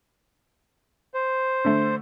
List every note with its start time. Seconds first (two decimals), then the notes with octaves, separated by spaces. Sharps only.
1.14 C5
1.65 D3 A3